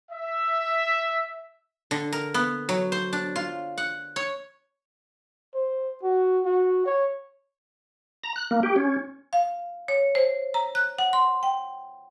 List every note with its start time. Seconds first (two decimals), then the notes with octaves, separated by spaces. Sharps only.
0.11 E5
1.91 D3
2.13 A#4
2.34 B3
2.69 F#3
2.92 C5
3.13 D4
3.36 F4
3.78 F#5
4.16 C#5
5.54 C5
6.03 F#4
6.45 F#4
6.86 C#5
8.24 A#5
8.36 F#6
8.51 A#3
8.63 G4
8.76 C#4
9.33 F5
9.88 C#5
10.15 C5
10.54 A#5
10.75 F#6
10.99 F#5
11.13 C6
11.43 G5